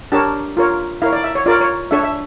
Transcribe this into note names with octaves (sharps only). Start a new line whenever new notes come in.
D4 G4 A#4 C#5 A5
F4 A#4 C#5
E4 A#4 C#5 F5
D5
E5
C#5
F4 A#4 C#5 D5
C#5
D4 A4 C#5 E5
E5